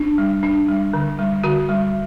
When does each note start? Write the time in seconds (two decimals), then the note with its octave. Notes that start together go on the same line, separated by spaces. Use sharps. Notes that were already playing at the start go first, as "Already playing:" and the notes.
Already playing: D4
0.18 G3
0.43 D4
0.68 G3
0.93 D3
1.19 G3
1.44 D3 F#4
1.69 G3